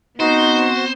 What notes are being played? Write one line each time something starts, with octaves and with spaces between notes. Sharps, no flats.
B3 C4 D#4 F#4 C5